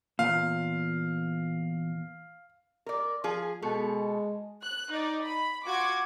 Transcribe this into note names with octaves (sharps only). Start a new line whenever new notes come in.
E2 A#2 F5
A#4 D5
F3 G#4
B2 G#3 A4
F#6
D#4 D5
B5
F4 F#4 D6 G#6